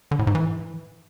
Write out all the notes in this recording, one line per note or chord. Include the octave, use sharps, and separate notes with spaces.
D3
A2
G#2
E3